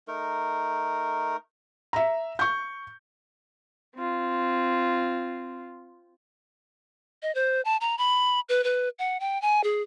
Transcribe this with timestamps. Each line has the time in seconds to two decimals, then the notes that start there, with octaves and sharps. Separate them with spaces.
0.08 A3 D#4 A#4
1.93 E5 A#5
2.39 C#6 G6
3.96 C4 F4
7.22 D#5
7.35 C5
7.65 A5
7.81 A#5
7.98 B5
8.49 B4
8.64 B4
8.99 F#5
9.20 G5
9.42 G#5
9.64 G#4